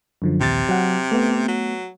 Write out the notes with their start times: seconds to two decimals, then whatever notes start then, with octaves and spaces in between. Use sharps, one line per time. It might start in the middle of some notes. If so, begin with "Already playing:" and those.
0.22 F#2 D3 F3
0.41 A#1 D#2 C3 A6
0.69 F#3 F#5
1.12 A3 B3
1.48 F#3